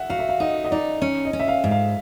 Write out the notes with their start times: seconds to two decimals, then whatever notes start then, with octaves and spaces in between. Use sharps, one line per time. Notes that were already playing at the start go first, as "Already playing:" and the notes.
Already playing: E5 F#5
0.10 F#4 F5
0.19 E5
0.29 F5
0.40 D#4 D#5
0.65 D#5
0.71 D#4 D5
1.02 C#4
1.25 D#5
1.33 C#4
1.40 E5
1.48 F5
1.64 G#2
1.71 F5